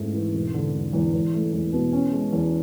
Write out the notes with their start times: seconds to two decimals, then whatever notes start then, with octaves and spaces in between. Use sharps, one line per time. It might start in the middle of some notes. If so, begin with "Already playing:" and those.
Already playing: G#2 A3 E4
0.14 E3
0.33 E1
0.54 D3
0.74 E1
0.93 E2
1.13 E2
1.34 A3
1.53 E2
1.73 B2
1.92 C#4
2.12 G#3
2.33 E2